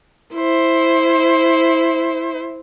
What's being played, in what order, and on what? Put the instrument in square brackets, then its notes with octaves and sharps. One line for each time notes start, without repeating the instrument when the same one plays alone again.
[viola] E4 C5